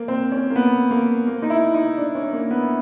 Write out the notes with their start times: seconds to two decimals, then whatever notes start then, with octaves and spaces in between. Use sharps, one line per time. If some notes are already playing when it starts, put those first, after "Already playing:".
Already playing: A#3
0.08 C4
0.32 C#4
0.50 A#3
0.56 B3
0.91 A#3
1.27 A#3
1.42 D#4
1.50 E4
1.74 D#4
1.97 D4
2.15 C#4
2.33 A#3
2.51 B3